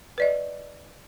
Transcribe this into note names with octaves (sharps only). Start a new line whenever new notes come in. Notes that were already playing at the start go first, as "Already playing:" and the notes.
B4 D5 D#5